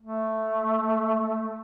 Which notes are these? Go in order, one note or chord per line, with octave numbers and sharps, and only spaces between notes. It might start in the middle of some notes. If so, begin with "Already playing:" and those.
A3